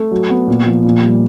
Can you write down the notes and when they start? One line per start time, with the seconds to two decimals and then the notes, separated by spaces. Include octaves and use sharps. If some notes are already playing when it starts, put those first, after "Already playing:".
Already playing: A3
0.11 F#3
0.30 B3
0.47 A#2
0.67 F3
0.85 A#2
1.03 G3